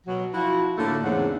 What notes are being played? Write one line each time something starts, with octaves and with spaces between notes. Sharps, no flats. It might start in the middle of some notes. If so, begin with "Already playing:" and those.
B2 F#3
F3 E4 F#4
A2 D3 A3 A#3
E2 G#2 C#3 D4 F#5